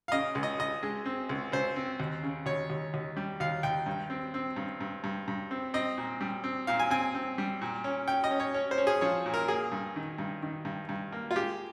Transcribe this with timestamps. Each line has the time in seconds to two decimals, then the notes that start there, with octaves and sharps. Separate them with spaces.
0.08 F5
0.12 C#3 D#5
0.35 C#2
0.43 D#5
0.59 C#2 D#5
0.83 G#3
1.06 C4
1.29 C#2
1.52 C#2 C5
1.76 C4
2.00 D#2
2.23 C#3
2.46 D#2 C#5
2.70 D#2
2.94 D#2
3.17 G3
3.40 D#2 F5
3.63 D#2 G5
3.86 G2
4.10 C4
4.34 C4
4.56 G2
4.81 G2
5.04 G2
5.28 G2
5.51 C4
5.74 C4 D#5
5.98 A#2
6.21 G3
6.44 C4
6.67 A#2 F5
6.79 G#5
6.91 C4 G#5
7.15 C4
7.38 G3
7.62 A#2
7.84 C#4
8.08 C#4 G5
8.24 D#5
8.31 C#4
8.40 C#5
8.54 C#4
8.71 C5
8.78 C#4
8.87 G#4
9.01 F3 C#5
9.26 A#2
9.34 A#4
9.48 A#3 G#4
9.72 G2
9.96 D#3
10.18 G2
10.42 D#3
10.65 G2
10.89 G2
11.12 A#3
11.31 F4
11.36 G#3 G4